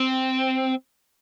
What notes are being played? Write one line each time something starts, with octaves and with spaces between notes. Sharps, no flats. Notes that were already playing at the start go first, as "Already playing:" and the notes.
Already playing: C4